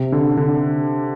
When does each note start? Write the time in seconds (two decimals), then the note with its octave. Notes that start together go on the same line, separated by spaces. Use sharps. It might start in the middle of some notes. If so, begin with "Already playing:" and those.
Already playing: C3
0.12 D3
0.37 D3